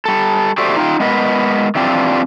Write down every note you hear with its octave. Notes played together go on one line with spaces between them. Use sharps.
G3 A4
F#4 G4 A4 C5 D5 E5
D#4 F4 G5
G#3 B3 A#4 B4 D#5
E3 G3 C4 D4 F4